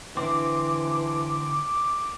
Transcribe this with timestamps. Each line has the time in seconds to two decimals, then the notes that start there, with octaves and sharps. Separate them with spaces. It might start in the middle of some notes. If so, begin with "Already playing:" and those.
0.17 D3 E3 C4 D6